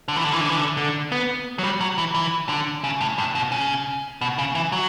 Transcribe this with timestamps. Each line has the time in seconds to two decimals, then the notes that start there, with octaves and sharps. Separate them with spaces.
0.08 D3
0.16 E3
0.24 D3
0.32 E3
0.41 D3
0.49 E3
0.57 D3
0.77 D3
1.12 B3
1.58 F#3
1.63 G3
1.81 F#3
1.98 E3
2.15 E3
2.49 D3
2.84 C#3
3.01 A2
3.18 G2
3.35 B2
3.52 C#3
4.21 B2
4.38 C#3
4.55 E3
4.72 F#3